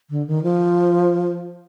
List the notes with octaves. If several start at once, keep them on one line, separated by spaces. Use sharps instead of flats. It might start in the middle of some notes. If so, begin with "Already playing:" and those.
D3
D#3
F3